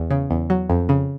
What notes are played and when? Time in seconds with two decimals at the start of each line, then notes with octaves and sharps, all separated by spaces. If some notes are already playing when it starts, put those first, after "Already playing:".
Already playing: E2
0.10 C#3
0.31 E2
0.50 F#3
0.70 F2
0.89 C#3